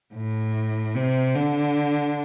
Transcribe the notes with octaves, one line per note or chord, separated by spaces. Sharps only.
A2
C3
D3